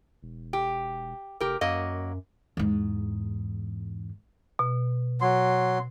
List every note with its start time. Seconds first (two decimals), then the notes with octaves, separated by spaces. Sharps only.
0.23 E1
0.53 G4
1.40 F1 G4 A#4
1.61 F#2 F#3 A#3 D#5
2.57 E2 G#2
4.59 B2
5.21 F#3 C6